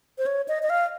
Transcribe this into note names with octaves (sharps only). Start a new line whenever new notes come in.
C5
C#5
D#5
D#5
F5